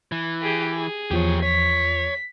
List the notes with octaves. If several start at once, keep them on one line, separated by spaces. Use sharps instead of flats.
E3
G4 G#4
G#4
E2 F3 G4 C#5
C#5 B6